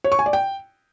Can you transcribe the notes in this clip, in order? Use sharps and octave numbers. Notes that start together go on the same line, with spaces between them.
C#5
C#6
G#5
D5
G5